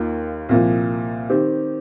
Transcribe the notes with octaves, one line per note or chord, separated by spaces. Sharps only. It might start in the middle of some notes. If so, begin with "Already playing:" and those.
Already playing: D#2 D#3 A#3 F4
C2 A#2 F3
D#3 C4 G4